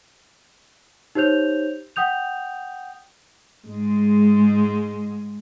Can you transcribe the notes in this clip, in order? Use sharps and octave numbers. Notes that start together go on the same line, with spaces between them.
D#4 G4 C5 C#5 G6 F7
F#5 G5 D#6 G6 F7
G#2 G#3